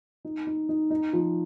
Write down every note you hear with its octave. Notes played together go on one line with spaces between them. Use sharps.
D#4
D#4
D#4
D#4
F3